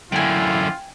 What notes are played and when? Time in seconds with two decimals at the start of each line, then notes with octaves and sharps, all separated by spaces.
0.12 F#2 D3 E4 F4 G5 G#5